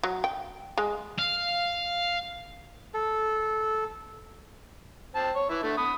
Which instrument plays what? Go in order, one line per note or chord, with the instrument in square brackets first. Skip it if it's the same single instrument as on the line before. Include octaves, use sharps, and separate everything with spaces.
[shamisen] F#3
G5
G#3
[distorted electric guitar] F5
[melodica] A4
[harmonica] C4 A5
C#5
E3 E4
D3 A3
B5 D#6